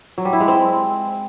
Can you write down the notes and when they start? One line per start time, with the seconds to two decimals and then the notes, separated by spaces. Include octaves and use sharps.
0.18 F#3
0.25 G3
0.33 E4
0.40 G#3
0.48 C4